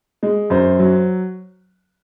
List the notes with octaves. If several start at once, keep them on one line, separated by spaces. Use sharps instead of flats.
G#3
F#2 C5
F#3